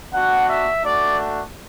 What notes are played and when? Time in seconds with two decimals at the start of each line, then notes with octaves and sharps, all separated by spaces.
0.11 B3 D4 F#4 F#5
0.48 E5
0.83 A3 D4 F#4 D5